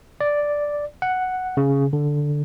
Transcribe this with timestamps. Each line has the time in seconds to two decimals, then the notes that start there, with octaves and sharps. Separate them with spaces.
0.21 D5
1.02 F#5
1.57 C#3
1.93 D3